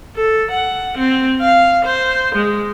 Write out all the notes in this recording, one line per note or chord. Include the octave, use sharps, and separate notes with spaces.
A4
F#5
C4
F5
C5
G#3